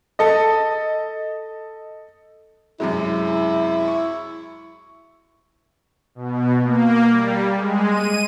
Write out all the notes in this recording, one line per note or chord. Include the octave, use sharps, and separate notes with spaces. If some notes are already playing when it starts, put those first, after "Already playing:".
A4 D#5
F#2 C3 G#3 E4
C#6
B2
A#3
G3
G#3
D#7